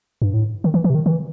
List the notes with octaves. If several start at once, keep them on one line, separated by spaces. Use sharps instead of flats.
G2
A2
D#3
E3
E3
C3
D#3
D#3
E3